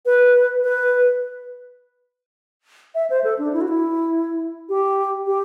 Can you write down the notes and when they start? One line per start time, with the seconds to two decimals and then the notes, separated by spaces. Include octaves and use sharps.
0.06 B4
0.64 B4
2.95 E5
3.10 C5
3.24 A4
3.39 D4
3.53 E4
3.61 F#4
3.68 E4
4.69 G4
5.27 G4